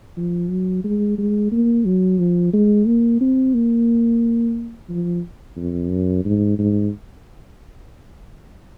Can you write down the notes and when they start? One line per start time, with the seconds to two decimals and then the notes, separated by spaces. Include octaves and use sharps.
0.17 F3
0.50 F#3
0.84 G#3
1.18 G#3
1.52 A#3
1.85 F#3
2.19 F3
2.53 G#3
2.86 A#3
3.21 C4
3.54 A#3
4.89 F3
5.56 F2
5.90 F#2
6.25 G#2
6.58 G#2